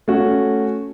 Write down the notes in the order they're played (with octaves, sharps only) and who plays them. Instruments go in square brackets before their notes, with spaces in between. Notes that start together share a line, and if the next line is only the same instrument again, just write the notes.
[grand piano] A3 C#4 F#4